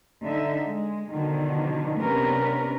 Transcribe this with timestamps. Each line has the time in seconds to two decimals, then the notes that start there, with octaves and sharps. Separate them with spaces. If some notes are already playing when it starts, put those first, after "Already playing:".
0.24 D3 D#4 E5
0.69 G#3
1.11 B2 D3 D#3 F3
1.99 C3 B3 C#4 D4 A#4 B4